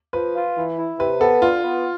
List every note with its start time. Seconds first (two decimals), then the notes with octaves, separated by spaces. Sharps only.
0.13 F3 B4
0.35 F4
0.56 E3
0.78 E4
0.99 C3 B4
1.20 B3 A4
1.42 D3 F4
1.64 B3